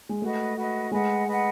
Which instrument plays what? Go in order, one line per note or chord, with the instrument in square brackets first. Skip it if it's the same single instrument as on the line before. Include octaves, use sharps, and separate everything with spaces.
[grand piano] G#3
[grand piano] A3 [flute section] F#4 B4 D#5
[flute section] F#4 B4 D#5
[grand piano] G#3 [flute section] B4 D#5 F#5
[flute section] B4 D#5 F#5